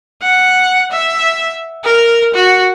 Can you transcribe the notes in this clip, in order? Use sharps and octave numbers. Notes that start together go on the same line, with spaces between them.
F#5
E5
A#4
F#4